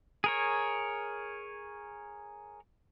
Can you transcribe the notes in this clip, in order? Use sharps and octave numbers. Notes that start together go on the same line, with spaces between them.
G#4 A#4 C#5